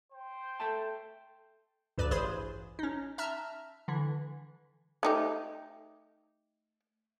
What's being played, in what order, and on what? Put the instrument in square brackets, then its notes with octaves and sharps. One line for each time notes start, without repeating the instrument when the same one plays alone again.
[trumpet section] C5 G5
[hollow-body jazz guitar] A4 E5 A5
[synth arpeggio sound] D2 G2 B4 D5 E7
A1 G#4 C5 B5 C6 G#6
C#4 D#4
E5 A5 A#5 F6
D3 E3
[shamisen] A3 D#4 G4